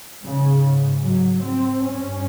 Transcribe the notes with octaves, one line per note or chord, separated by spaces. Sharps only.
G#2 C#3
F#3
C4
G2 C#4